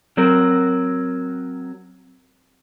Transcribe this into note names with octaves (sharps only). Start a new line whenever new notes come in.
F#3 C4 F#4 A#4